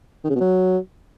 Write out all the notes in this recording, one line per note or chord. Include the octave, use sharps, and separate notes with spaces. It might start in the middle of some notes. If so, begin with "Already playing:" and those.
D#3
C#3
B2
F#3